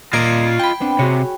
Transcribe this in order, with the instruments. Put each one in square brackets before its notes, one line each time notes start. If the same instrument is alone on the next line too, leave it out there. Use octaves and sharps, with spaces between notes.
[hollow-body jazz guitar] A#2 A#3 A#4 [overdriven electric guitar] F4 D#5 [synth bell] G#6 C7 D7
[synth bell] G5 B5
[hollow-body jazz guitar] B3 C4 D4
[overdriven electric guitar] C3 [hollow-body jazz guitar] F#4 G#4 C#5